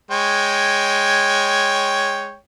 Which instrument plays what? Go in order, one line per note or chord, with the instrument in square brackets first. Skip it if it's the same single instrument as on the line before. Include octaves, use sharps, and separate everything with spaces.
[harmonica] G#3 C#5 G5